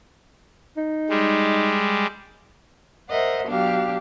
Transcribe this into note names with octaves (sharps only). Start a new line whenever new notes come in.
D#4
G3 G#3
A#4 C5 D#5 E5 F#5
B2 F#3 D4 G4 F5